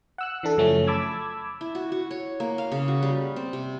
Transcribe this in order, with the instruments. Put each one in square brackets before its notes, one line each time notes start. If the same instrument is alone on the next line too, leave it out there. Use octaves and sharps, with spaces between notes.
[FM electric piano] F#5 E6 F#6
E3 D4 A4
F#2 C#3 F3 F#3 A3 C#4
A5 B5 D6 E6 G#6
[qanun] E4
F#4
F#4
C#5
A#3
F5
C#3
F#4
G3
C4
C3